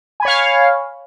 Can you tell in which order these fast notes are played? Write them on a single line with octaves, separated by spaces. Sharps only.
G#5 B5 C#5 F5